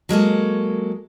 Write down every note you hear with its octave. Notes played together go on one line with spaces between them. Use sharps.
F#3 G#3 A#3 A4